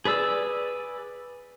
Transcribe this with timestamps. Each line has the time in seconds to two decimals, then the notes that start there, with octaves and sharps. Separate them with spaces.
0.05 G#4 B4 D5 E6